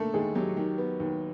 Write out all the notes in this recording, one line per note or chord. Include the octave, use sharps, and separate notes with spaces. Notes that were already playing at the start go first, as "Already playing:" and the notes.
Already playing: D3 A3 A#3 A4
D#2 G#3 G#4
F#3 G4
D#3 G4
B3
D#2